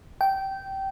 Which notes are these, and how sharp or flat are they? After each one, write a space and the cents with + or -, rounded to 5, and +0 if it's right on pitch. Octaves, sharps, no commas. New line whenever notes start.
G5 -15